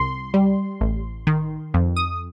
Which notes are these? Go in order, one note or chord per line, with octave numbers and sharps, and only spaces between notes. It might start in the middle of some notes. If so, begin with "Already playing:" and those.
Already playing: C2 C6
G3
A1
D#3
F2
D#6